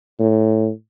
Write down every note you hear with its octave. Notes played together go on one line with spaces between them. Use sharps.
A2